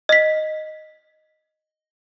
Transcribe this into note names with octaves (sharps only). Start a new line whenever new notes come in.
D#5 B6